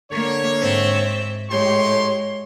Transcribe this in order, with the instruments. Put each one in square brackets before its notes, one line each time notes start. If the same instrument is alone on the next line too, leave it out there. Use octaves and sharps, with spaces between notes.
[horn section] D3 C#5 [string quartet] A#3
[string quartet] G#2 C4 E5
[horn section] A2 G4 C6 [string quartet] G#3 C#5